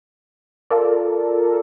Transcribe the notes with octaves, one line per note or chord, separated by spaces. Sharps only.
F4 A4 A#4 D5